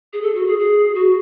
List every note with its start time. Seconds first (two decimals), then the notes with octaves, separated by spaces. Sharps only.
0.13 G#4
0.22 A4
0.35 F#4
0.46 G#4
0.59 G#4
0.95 F#4